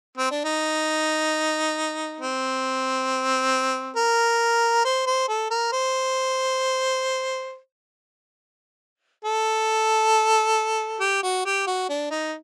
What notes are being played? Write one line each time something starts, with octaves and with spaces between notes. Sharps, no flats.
C4
D4
D#4
C4
A#4
C5
C5
A4
A#4
C5
A4
G4
F#4
G4
F#4
D4
D#4